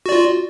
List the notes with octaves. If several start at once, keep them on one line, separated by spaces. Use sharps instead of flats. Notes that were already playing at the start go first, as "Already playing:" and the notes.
F4 F#4 D5